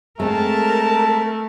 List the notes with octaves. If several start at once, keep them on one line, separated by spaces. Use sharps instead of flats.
G#3 A3 C4 A#4 A5